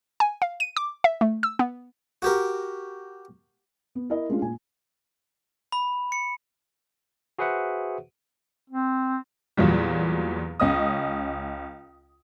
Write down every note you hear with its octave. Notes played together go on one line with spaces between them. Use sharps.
G#5
F5
D#7
D6
E5
A3
E6
B3
F#4 G4 A#4
B3
E4 A#4 D#5
G#3 A3 C#4 D4 F4
A#2 G#5
B5
C#7
F#4 G#4 B4 C5 E5 F#5
C4
E2 A#2 F#3 G3
C#2 C#4 D#5 D#6